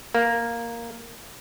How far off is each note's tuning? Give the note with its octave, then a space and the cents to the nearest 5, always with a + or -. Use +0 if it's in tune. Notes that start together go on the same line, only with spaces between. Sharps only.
A#3 +0